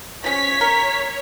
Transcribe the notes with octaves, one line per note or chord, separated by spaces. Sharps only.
F3 C#4 C#5 B6
A#4